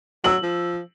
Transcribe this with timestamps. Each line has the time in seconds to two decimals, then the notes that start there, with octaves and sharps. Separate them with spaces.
0.24 F#3 E6 F#7
0.43 F3